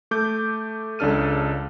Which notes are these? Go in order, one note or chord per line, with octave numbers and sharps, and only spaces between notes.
A3 D6 G6
C#2 C#3 D4 A4 F6 D#7